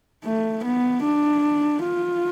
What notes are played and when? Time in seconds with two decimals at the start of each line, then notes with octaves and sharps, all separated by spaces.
0.25 A3
0.65 B3
1.04 D4
1.83 F4